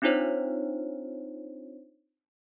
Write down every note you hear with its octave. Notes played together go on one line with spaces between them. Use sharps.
C4 D4 D#4 F4 C5 C#5